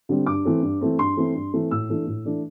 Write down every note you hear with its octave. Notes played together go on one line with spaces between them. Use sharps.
D3 G3 C4
G2 D6
E3 A3 C4
G2
E3 A3 C4
G2 C6
E3 A3 C4
G2
E3 A3 C4
A2 E6
E3 A3 D4
A2
E3 A3 D4